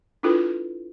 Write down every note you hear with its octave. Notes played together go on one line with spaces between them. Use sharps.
D4 E4 F4 A4 B4